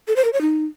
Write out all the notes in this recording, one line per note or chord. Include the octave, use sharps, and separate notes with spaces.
A4
C5
A#4
C#5
D#4